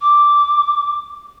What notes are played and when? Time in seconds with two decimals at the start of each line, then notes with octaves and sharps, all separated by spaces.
0.01 D6